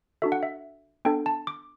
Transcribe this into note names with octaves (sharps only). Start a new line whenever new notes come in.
D4 F#4 A4 E5
F#5
E5
B3 D4 A4 G5
A5
D6